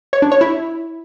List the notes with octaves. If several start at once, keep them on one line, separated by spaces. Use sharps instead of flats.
C#5
D4
C#5
E4